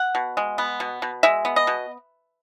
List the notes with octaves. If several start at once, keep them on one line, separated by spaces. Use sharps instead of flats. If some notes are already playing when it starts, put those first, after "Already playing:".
Already playing: F#5
B2
G#3
B3
B2
B2
G#3 E5
B3
D#5
B2